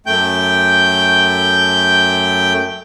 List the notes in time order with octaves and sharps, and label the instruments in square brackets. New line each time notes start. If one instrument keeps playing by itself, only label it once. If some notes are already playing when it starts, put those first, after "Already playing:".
[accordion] F#2 A3 G5 G6